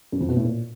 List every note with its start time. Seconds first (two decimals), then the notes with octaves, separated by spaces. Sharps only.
0.12 F#2
0.20 F2
0.29 B2
0.37 A2
0.45 A#2